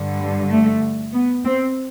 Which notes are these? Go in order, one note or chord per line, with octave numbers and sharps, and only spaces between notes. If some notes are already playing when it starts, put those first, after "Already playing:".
Already playing: G2 D3
G3
A3
B3
C4